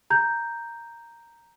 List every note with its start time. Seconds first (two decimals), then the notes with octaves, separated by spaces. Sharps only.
0.10 A#5 G6